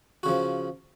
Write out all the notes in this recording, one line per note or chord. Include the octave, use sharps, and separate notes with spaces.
C#3 F3 F#4